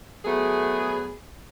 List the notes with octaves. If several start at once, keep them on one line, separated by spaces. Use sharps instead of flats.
F#3 A3 B3 G#4